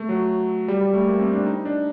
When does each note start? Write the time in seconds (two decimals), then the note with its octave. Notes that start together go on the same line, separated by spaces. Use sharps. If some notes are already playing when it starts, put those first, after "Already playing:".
Already playing: A3
0.09 F#3
0.68 G3
0.81 G3
0.94 A3
1.07 A#3
1.20 C4
1.32 D4
1.46 D#4
1.65 D4